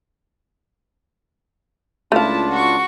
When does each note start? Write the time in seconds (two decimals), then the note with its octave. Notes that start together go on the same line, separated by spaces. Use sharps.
2.12 C#2 A3 D4 E4 F4 F5 A5
2.50 F#4 C#6